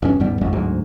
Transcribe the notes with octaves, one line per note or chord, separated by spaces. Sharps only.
E1 G2 C#4
D#1 G#2 G3 B3
G#1 F2 G#3
D1 D2 G#2 F#3